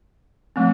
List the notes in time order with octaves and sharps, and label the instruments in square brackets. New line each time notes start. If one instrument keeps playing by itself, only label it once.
[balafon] F3 A3 C4